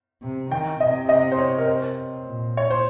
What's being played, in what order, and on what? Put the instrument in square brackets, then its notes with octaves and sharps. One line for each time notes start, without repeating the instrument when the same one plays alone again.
[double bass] C3
[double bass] D#3 [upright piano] G5
[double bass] C3 [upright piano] D#5
[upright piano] D#5
C5
C#5
A#4
C5
[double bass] A#2
[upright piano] C#5
C5